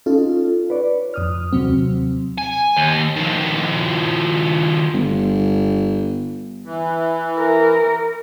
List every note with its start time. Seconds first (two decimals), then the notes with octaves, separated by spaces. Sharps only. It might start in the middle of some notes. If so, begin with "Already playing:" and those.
0.06 C#4 D#4 F4 A4
0.70 B4 C#5 D5
1.14 F2 D#6 F6
1.53 D#2 C3 F#3 C4
2.38 G#5
2.77 D#2
3.16 D#3 F3
4.93 G1
6.65 E3
7.39 A#4